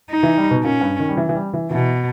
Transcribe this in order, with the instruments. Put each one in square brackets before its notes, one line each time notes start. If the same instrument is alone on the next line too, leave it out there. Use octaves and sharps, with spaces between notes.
[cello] D#4
[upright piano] E3
G3
B2
[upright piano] A#2 [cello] C#4
[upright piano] G2
D#3
G3
E3
E3
G3
E3
[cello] B2 [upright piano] E3